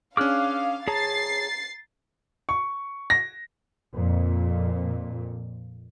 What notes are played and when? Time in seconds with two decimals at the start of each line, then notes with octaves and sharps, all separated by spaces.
0.17 C#4 D4 G#4 F5 D6 F6 F#6
0.88 G#4 C#5 A5 A#5 A6 C7
2.49 C#6
3.10 A#6
3.94 F2 A#2